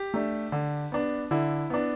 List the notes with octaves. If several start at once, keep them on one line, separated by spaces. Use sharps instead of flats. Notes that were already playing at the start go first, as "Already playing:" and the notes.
Already playing: G4
A3 D4
D3
B3 D4
D3 E4
B3 D4